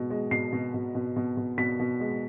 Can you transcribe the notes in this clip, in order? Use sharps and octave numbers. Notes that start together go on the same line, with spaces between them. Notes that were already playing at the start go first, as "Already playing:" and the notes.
Already playing: B2 G#3
G#3
B2 C7
B2
B2
B2
B2
B2
B2 B6
B2
G#3